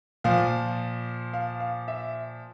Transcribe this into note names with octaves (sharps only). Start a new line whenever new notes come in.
A#2 F3 F5
F5
F5
E5